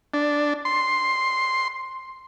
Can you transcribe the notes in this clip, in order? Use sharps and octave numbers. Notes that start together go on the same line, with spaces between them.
D4
C6